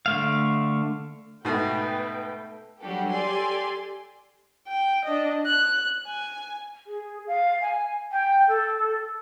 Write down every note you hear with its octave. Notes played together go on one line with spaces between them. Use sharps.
D3 A3 F5
G#2 B2 A3 A4 B4 E5 G5
F#3 G3 D4 F#4 G4 A4
G4 A4 D5 G#5 C6
G5
D4 D#5
F#6
G#5
G#4
F5
G#5
G5
A4